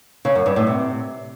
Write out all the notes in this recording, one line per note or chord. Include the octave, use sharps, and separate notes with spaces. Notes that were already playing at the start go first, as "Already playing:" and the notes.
C#3
F#2
G2
A2
C3